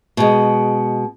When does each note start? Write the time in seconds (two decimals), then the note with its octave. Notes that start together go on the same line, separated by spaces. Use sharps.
0.17 B2 G#3